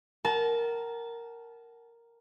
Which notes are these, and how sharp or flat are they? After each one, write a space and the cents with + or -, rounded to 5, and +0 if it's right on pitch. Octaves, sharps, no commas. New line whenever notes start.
A#4 +0 F#5 +35 A5 -25